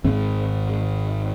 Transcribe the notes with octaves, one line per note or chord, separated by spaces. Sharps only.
G#1 G#2 C4